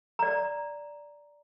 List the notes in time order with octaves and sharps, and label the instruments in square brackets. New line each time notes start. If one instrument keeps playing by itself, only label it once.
[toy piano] D5 A#5